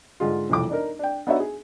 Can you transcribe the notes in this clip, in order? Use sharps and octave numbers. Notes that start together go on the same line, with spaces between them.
G#2 D3 G#3 F4
E1 C2 F2 D6
D4 D#4 A#4
D4 G5
B3 D4 D#4 F#4 C#5 E5
G#4